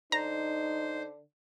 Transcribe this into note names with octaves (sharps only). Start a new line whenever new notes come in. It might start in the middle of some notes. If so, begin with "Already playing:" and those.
D3 D#4 C5 A#5